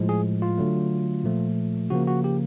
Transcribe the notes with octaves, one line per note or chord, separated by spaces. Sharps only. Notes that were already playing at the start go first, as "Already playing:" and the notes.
Already playing: A2 F3 G#3
G#4
F4
D3 F#3 A3
A#2 F3 A3
C#3 F3 A#3 F#4
F#4
G4